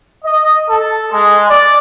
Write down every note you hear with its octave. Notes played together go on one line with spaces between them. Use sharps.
D#5
A4
G#3
D5